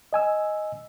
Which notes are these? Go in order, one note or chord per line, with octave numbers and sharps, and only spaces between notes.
D#5 G#5 E6